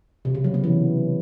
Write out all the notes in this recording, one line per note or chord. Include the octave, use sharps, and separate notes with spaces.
C3
C#3
F#3
B3
E3